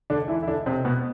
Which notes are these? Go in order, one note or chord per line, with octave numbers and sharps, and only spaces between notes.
D3 D4
E3 E4
E4
D3 D4
C3 C4
B2 B3